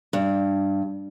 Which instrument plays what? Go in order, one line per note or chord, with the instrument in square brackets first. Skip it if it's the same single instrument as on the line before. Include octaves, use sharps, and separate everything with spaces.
[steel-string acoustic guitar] G2